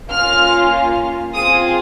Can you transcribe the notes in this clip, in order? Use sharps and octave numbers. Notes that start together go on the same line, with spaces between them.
A#3 C#4 F4 F6
C4 F4 G#4 D#6